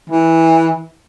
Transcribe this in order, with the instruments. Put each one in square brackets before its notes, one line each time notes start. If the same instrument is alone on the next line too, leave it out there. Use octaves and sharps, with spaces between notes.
[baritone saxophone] E3